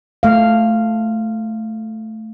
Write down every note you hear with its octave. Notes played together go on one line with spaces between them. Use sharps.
A3 F5